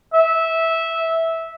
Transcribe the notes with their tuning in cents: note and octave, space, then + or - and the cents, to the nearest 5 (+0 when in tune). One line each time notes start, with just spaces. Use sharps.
E5 -10